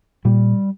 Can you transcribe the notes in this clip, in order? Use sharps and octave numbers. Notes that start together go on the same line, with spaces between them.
A#2 G3